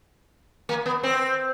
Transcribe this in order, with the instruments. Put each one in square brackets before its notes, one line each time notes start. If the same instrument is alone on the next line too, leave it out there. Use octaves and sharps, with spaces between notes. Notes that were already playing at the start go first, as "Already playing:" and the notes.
[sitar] A#3
B3
C4